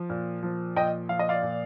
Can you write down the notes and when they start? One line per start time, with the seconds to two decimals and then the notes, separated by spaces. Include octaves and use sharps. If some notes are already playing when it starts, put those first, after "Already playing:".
Already playing: F3
0.10 A#2
0.43 F3
0.76 A#2 D#5 G5
1.09 F3 F5
1.19 D#5
1.29 D5 F5
1.42 A#2